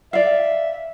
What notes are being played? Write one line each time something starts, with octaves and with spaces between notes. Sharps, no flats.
D5 E5 F5